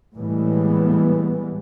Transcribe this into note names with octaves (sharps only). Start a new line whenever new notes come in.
A2 E3 G3 G#3 B3